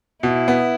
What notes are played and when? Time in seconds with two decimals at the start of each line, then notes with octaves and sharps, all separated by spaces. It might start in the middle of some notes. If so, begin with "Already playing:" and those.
0.23 B2 E4
0.48 B3